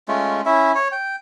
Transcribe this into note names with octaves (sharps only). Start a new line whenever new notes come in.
G#3 A3 C#4 F4
C#4 E4 E5
C#5
G5